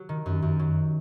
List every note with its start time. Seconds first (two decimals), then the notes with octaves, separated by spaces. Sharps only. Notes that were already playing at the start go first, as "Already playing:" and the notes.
Already playing: F#3
0.09 D#3
0.26 F#2
0.42 F#2
0.59 F#3